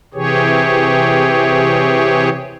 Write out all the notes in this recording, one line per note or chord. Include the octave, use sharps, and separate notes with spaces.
C3 E3 G4 G#4 C#5